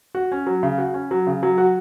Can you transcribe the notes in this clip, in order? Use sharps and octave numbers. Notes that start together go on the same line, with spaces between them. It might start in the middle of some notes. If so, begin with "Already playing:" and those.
F#4
C#4
F#3
C#3
F#4
C#4
F#3
C#3
F#3
F#4